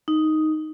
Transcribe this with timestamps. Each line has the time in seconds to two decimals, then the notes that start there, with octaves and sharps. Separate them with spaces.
0.08 D#4